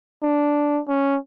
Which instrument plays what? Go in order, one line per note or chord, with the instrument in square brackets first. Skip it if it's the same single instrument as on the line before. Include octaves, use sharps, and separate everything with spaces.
[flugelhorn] D4
C#4